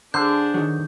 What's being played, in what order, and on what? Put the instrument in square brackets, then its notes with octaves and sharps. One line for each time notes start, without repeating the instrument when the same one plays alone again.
[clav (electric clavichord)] D3 C5 [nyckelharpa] D4 G#4 [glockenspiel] G6
[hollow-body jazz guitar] D#3 F#3